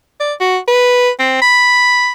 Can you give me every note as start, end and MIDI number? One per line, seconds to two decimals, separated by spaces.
0.20 0.33 74
0.41 0.58 66
0.68 1.09 71
1.19 1.41 60
1.42 2.13 83